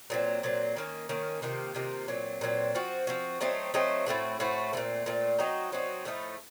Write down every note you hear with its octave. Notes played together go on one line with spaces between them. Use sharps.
A#2 F#3 C4
A#2 F#3 C4
D#3 A#3 C#4
D#3 A#3 C#4
C3 D#3 A#3 F4
C3 D#3 A#3 F4
A#2 F#3 C4
A#2 F#3 C4
F3 C4 F#4
F3 C4 F#4
F#3 A3 C4 D#4
F#3 A3 C4 D#4
A2 A3 C4 F#4
A2 A3 C4 F#4
A#2 A3 C4
A#2 A3 C4
F#3 C4 D#4 F#4
F#3 C4 D#4 F#4
A2 F3 A3 D#4